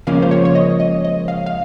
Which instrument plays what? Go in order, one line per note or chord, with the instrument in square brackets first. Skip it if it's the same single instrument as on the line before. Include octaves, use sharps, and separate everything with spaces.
[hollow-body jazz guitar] C#2 C#3 F3 A#3 C#4 [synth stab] F5
[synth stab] C5
C#5
C#5
D#5
D#5
D#5
F5
F5